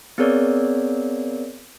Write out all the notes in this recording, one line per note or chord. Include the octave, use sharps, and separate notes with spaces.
B3 C4 G#4 A#4 C#5 D5